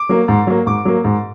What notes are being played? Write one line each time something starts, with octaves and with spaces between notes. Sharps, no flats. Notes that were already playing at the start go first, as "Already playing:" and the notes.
Already playing: D6
F#3 A#3
G#2
F#3 A#3
G#2 D6
F#3 A#3
G#2